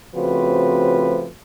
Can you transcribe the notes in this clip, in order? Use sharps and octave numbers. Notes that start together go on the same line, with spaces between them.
C#3 F3 A3 C4 F#4 B4